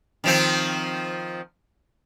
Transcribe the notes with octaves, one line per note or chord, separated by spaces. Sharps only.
D#3 F3 C4